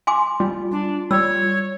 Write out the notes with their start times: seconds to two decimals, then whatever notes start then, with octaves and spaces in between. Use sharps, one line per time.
0.07 G#5 C6 D6
0.40 G3 F4
0.71 D4 F4
1.11 G3 C#5 E6